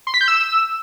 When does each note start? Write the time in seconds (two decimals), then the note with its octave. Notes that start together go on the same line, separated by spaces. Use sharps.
0.07 C6
0.14 B6
0.21 G6
0.28 E6